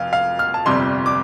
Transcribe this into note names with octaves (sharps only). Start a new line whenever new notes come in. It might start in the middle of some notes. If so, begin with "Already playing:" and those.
Already playing: F1 F2 F5
F5
F6
A5
G1 F2 C3 G3 C6
D6